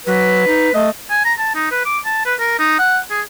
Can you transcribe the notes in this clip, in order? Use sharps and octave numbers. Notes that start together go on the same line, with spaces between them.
F#3 B4
D#4
A3 D#5
G#5
A#5
A5
D#4
B4
D6
A5
B4
A#4
D#4
F#5
G#4